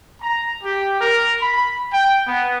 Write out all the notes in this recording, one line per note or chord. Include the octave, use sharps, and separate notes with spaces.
A#5
G4
A#4
B5
G5
B3